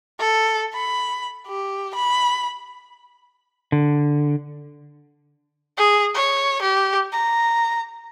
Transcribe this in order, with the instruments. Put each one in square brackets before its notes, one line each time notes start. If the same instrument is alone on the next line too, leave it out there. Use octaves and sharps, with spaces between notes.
[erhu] A4
B5
G4
B5
[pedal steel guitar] D3
[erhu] G#4
C#5
G4
A#5